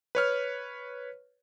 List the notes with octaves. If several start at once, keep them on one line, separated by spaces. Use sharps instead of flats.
B4 C#5 F6